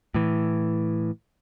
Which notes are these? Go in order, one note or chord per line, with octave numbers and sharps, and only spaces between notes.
A2 E3